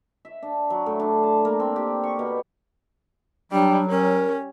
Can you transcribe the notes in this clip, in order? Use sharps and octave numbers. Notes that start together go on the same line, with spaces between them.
E5
D4
F#3
A2
D4
A5
A#3
C4
G4
C#6
B2
F#3 G3 D4
C#4 A#4